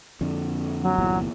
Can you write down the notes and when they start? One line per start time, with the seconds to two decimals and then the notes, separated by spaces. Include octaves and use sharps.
0.21 F2 D3
0.82 F#3
0.98 G1 E2 A#2